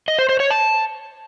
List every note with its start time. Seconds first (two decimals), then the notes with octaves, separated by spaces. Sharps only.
0.08 D#5
0.19 C5
0.29 C5
0.40 C#5
0.51 A5